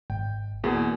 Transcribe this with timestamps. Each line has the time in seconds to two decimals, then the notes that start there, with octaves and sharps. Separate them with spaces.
0.10 G#1 G5
0.64 E2 B2 A#3 G#4